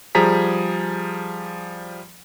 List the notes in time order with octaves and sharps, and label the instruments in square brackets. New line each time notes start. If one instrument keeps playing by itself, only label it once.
[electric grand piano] F3 G3 G#4 A#5 B6